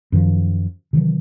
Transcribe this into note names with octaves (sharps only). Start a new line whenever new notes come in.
F#2 D#3 F3
C3 D#3 E3 F#3